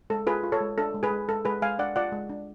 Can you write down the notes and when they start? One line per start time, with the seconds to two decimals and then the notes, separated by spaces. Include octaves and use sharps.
0.10 G#3 A4
0.26 F4 G#4 B4
0.44 F4
0.52 A4 C#5
0.61 G#3
0.78 D4 A4
0.94 G#3
1.03 G#4 B4
1.11 G#3
1.29 G#3 A4
1.45 G#3 G#4 B4
1.62 G#3 F5 G#5
1.79 D4 D5 F#5
1.96 F4 D5 F#5
2.12 G#3
2.29 D4